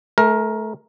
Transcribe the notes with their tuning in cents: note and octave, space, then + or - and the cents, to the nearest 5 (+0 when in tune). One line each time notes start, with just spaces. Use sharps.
A3 -25 A#4 +15